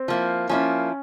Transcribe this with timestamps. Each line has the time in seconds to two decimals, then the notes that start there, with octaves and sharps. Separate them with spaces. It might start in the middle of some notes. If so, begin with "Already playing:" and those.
Already playing: C4
0.08 F3 A#3 E4
0.49 F3 A#3 C#4 E4